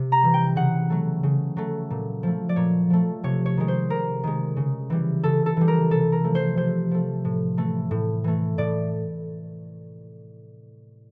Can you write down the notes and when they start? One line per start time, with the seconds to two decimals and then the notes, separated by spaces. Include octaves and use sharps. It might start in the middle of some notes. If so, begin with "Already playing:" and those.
Already playing: C3
0.12 A#5
0.23 E3 G3
0.34 G5
0.56 C#3 F#5
0.90 F#3 A3
1.23 C#3
1.57 F#3 A3
1.90 A#2
2.23 F3 A3
2.49 D5
2.56 A#2 C#5
2.90 F3 A3
3.23 C3 C#5
3.46 C#5
3.57 D#3 G#3
3.68 C5
3.90 C3 A#4
4.23 D#3 G#3
4.56 C#3
4.90 E3 G3
5.24 C#3 A4
5.46 A4
5.57 E3 G3
5.68 A#4
5.91 C3 A4
6.12 A#4
6.24 F3 A3
6.35 C5
6.57 C3 C5
6.91 F3 A3
7.25 A2
7.57 E3 A3
7.91 A2
8.24 E3 A3
8.58 A2 D5